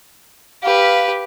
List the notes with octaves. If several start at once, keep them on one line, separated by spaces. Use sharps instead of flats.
G4 B4 F5